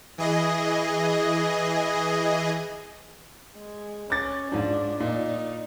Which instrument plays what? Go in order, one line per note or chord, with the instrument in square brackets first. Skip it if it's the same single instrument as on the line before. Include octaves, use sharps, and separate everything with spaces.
[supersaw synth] E3 G#4 D#5
[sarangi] G#3
[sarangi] C#4 [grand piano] D6 A6
[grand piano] G#2 F3 [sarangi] D4
[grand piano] A#2 [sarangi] D#4